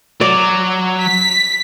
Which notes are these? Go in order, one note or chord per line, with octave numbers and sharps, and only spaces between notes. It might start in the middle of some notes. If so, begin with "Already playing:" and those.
F#3 D5
B6